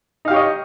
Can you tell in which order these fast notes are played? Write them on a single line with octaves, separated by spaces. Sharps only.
D#4 F5 G4 C#5 D#5